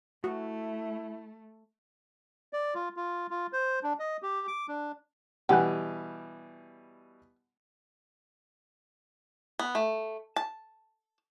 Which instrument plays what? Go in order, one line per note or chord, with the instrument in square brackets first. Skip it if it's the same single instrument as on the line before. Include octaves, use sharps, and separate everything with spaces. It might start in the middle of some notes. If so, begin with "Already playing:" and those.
[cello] A3 [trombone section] E4 [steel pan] F#4
[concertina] D5
F4
F4
F4
C5
D4
D#5
G4
D6
D4
[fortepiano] B2 E3 G3 [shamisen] G4 [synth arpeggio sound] F#5 G#5 F#6
[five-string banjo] B3
A3
A5